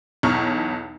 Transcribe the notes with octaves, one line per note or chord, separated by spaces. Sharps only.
B1 E2 C#5 A#5 C#6 F6